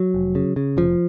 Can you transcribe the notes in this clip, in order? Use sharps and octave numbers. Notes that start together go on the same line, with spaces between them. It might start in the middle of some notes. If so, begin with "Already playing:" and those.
Already playing: F#3
F1
C#3
C#3
F1 F3